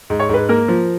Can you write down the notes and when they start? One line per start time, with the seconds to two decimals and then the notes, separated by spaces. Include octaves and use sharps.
0.10 G#2
0.20 C#5
0.29 G#2 B4
0.49 A#3 A#4
0.68 F3